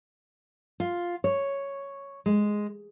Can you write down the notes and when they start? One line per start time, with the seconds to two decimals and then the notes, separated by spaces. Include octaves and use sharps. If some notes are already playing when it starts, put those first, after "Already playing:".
0.80 F4
1.24 C#5
2.26 G#3